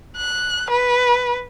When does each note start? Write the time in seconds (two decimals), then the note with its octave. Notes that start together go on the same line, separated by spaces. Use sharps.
0.17 F#6
0.70 B4